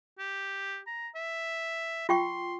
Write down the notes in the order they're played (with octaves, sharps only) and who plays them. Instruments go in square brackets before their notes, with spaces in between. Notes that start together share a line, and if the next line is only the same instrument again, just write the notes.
[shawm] G4
A#5
E5
[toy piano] F4 G5 C#6 [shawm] C6